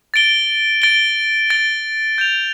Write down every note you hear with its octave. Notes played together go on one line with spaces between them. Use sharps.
A6 D7 G7
A6 D7 G7
A6 D7 G7
G6 D7 F7